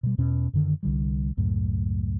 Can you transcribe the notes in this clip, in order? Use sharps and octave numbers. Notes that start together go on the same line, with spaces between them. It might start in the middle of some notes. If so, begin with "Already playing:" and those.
B2 G3
E2 B2 C#4
F#2 D3 D#3
C2 D3 G3
C#2 F#2 A2